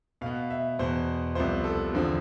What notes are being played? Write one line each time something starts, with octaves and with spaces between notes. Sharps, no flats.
B2 B3 F5
E5
E2 B2 B3 C5
C2 C3 F3 B3 C5
A4
E2 D3 F3 C4